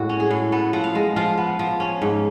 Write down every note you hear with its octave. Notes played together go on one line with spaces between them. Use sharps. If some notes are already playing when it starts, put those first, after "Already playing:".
Already playing: A2 G#3 F#4
C#4
G#4
A2
B3 A4
F3 F#5
F5
G#3
F3 F5
B3
F3
C#4
G#2